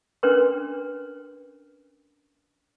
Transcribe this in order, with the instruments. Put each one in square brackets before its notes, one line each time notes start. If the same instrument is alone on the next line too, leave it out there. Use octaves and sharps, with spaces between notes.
[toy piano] C#4 D4 A#4 B4 G5 C6